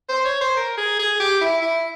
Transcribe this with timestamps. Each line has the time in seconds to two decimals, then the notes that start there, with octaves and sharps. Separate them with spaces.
0.09 C5
0.25 C#5
0.41 C5
0.56 A#4
0.77 G#4
0.99 G#4
1.20 G4
1.41 E4
1.62 E4